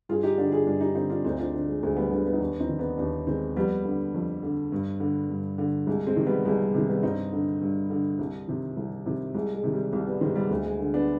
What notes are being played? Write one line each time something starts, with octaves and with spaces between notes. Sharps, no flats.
G2 F4 G#4
D#4 G4
D3 D4 F4
F4 G#4
G2 D4 F4
D#4 G4
D3 C4 D#4
D4 F4
D2 C4 D#4
D4 F4
D3
G#3
D2 G#3
G3 B3
D3 G3 B3
G3 B3
D#4
D#2 B3 D4
C4 D#4
D#3
B3 D4
D#2 B3 D4
D#3 G#3 C4
F2 G3 B3
D3
F2
D3
G2
D3
G2
D3
C2 G#3
G#3 C4
C3 D#3
G3 B3
C2 G#3
G3
C3 D#3 G#3
G3 B3
G2 C4 D#4
D3
G2
D3
C2
C3 D#3
C2
C3 D#3
C2 G#3
G#3
C3 D#3
G3
C2 G3
G3 B3
C3 D#3 G#3 C4
G3 B3
D2 G#3
G#3
D3
B3 D4